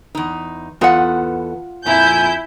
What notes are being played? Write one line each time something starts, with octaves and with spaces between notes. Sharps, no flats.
E2 D#4
E2 B3 F4 A4 F#5
F2 A#2 E4 G#5 G6